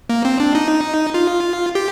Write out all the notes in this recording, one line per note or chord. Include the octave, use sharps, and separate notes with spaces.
A#3
C4
D4
D#4
F4
G4